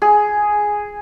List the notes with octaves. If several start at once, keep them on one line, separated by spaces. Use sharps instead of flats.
G#4